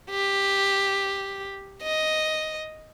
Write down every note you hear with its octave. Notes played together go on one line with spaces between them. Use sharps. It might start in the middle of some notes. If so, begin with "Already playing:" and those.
G4
D#5